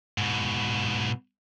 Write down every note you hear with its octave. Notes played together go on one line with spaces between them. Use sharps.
G#2 B2